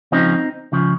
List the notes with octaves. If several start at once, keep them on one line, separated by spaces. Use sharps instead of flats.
C#2 C#3 F3 C4 D#4
C#2 C#3 F3